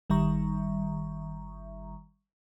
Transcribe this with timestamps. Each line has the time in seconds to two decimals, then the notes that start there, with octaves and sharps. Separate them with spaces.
0.10 G1 D#3 G3 E5 A#5 C#6